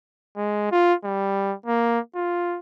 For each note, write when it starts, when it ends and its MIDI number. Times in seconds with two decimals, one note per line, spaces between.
0.37 0.71 56
0.72 0.94 65
1.04 1.53 55
1.66 1.99 58
2.15 2.59 65